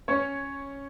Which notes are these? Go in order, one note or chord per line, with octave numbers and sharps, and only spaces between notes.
C#4 C#5